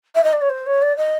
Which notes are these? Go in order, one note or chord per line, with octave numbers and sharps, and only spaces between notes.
E5
D#5
D5
C#5
C5
C#5
D5
D#5